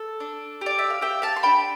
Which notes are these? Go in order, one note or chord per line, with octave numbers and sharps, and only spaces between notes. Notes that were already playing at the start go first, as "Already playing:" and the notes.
Already playing: A4
D4
G4 D5
E5
F5
G4 E5 G5
F5 A5
C6
D4 G5 B5